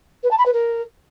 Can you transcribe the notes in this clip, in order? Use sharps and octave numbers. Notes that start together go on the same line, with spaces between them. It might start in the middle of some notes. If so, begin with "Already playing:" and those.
B4
A5
B5
B4
A#4